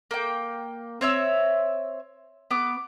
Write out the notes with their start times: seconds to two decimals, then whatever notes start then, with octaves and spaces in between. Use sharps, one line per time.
0.11 A#3 G5
1.01 C4 C#5 E5 E6
2.51 B3 D6